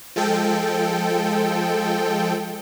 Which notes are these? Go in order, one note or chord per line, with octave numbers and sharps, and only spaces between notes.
F3 G#3 A4 G5